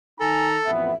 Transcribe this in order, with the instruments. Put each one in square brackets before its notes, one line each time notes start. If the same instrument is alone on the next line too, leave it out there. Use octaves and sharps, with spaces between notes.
[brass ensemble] D#3 D#4 A#5 [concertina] A4 [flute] G#5
[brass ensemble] A1 F2 B3 [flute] E5